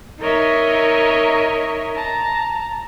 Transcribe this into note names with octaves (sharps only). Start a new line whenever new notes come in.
D#4 A#4 C#5 D#5 E5
A5 A#5